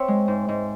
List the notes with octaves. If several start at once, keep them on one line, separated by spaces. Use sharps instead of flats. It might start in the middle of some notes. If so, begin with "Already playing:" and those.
Already playing: C4 C#5 E5
G#3
G#2
G#2